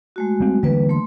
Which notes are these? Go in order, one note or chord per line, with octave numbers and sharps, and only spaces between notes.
G#3 A3 F#4
G3 C4
D3 E3 G3 A#3 B4
A3 C6